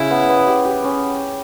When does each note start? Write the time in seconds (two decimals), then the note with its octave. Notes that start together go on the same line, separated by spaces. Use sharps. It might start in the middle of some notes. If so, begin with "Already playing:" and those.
Already playing: C#3 E4
0.11 B3
0.29 B3
0.47 G4
0.65 G4
0.84 C#4